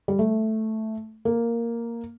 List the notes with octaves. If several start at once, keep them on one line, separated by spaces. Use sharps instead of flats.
G3
A3
A#3